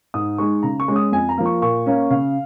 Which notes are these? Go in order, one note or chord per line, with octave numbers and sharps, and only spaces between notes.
G#2 D#6
G#3 D#4 C#6
C#3 A#5
C#6
G#3 C#4
D#6
F2 G#5
A#5
F3 A#3
C#6
A#2 C#6
A#3 C#4
C#3 F5